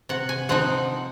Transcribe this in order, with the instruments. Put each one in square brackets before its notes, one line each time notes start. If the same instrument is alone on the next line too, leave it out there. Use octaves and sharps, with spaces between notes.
[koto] C3 F#5
G#5
F3 C4 D#4 F#5